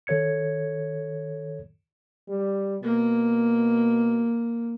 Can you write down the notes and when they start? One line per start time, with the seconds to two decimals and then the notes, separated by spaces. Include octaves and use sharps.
0.07 D#3 A4 C#5 G#6 C#7
2.28 G3
2.83 B2 A#3